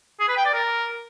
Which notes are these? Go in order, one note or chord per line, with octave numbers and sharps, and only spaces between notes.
G#4
B4
G5
D5
A#4